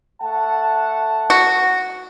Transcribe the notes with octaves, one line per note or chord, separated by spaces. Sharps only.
A3 F#5 A5
F#4